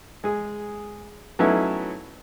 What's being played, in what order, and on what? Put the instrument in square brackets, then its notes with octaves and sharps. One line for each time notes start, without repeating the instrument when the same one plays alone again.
[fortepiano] G#3 G#4
F#3 A3 B3 C#4 D#4 E4